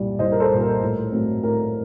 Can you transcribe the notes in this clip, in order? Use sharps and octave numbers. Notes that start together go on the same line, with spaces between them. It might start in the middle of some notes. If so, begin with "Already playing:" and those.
Already playing: C2 A#2 G3 D5
C2 C5 D#5
A#4
A4 C5
A#2 G3
A#4
A2
F#3 A3 C4
A2 A#4